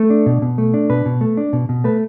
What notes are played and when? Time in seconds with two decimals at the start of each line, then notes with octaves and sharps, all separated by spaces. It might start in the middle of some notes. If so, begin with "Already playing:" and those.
Already playing: A3
0.10 D4
0.26 B2
0.42 B2
0.58 A3
0.74 D4
0.90 B2 B4
1.06 B2
1.21 A3
1.37 D4
1.53 B2
1.69 B2
1.84 A3 B4